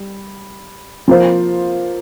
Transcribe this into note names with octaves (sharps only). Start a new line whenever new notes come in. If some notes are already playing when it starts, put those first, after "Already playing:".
Already playing: G3
F3 A#3 F4 C5